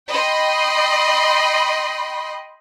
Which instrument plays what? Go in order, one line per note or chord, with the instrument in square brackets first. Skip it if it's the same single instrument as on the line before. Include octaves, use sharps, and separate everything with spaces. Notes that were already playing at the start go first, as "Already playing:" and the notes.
[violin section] D#5 G5 B5 C6